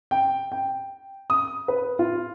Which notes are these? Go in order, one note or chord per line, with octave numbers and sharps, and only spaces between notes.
G5
G5
D#6
B4
F4